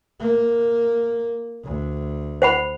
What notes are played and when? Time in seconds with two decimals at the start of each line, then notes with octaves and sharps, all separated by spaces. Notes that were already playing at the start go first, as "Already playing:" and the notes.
0.21 A#3
1.64 D2
2.42 C5 F#5 B5